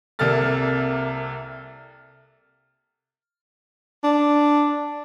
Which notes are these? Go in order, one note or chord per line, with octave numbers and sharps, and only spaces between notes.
C2 C3 A#3 A4 F6 A6
D4